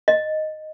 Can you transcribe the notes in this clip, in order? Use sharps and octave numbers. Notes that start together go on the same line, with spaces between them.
D#5